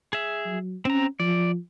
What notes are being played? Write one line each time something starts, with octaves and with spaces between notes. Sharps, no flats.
G#4 E5
F#3
C4 C#4 A#5
F3 D5